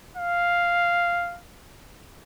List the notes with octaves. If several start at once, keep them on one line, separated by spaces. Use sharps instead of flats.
F5